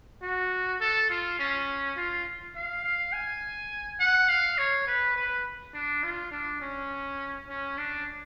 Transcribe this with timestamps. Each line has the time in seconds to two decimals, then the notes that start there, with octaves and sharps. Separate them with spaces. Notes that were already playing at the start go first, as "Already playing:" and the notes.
0.22 F#4
0.81 A4
1.10 F4
1.39 C#4
1.97 F4
2.55 F5
2.83 F5
3.13 G#5
4.00 F#5
4.29 F5
4.58 C#5
4.87 B4
5.16 B4
5.74 D4
6.04 F4
6.32 D4
6.61 C#4
7.49 C#4
7.78 D4